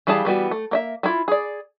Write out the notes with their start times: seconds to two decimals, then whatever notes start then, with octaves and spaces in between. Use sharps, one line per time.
0.07 E3 G3 G#4 F5 A5
0.25 E3 G3 B3 F#4
0.51 A3
0.71 A#3 D#5 E5
1.03 G3 E4 F4
1.28 G#4 D5